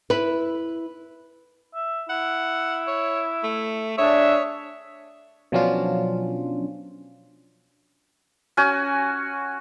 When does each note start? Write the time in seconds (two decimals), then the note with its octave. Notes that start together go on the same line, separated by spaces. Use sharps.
0.10 E4 B4
1.74 E5
2.09 E4 F#5
2.87 C#5
3.43 A3
3.98 D4 G#4 C#5 E5
5.52 B2 F3 F#3 C#4 D4 F4
8.57 C#4 F#4 G#5